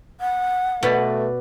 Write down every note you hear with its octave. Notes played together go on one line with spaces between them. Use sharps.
F#5
B2 A3 F#4 B4 D5